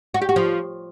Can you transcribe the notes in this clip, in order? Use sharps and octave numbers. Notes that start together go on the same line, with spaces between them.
F#4
G4
F#4
F3